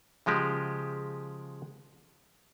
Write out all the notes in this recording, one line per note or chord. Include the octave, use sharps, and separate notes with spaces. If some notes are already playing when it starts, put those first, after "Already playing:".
C#3 F3 G#3 G4